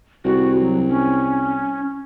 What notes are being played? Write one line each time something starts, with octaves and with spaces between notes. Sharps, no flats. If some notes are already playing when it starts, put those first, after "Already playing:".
C2 F#4
F#3
C#4